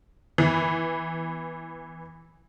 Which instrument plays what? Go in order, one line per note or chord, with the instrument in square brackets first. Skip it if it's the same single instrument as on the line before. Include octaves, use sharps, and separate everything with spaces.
[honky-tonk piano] E3 B3